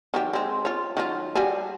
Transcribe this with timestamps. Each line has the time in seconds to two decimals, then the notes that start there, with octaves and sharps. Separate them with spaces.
0.14 D#3 F#3 G4
0.33 G#3 C4
0.65 F4 C#5
0.97 D#3 F#3 F4
1.35 G3 F#4 G#4